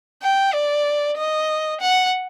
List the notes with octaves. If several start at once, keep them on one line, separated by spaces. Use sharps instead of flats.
G5
D5
D#5
F#5